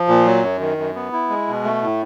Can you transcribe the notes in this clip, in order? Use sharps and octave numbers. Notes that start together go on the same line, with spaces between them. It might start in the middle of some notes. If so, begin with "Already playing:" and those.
Already playing: F3
A#2
F#3
F#2
D#3
F#2
B3
E4
G#3
B2
A3
A2